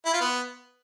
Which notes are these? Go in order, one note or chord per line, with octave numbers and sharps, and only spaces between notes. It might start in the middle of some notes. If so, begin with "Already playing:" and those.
E4
F4
B3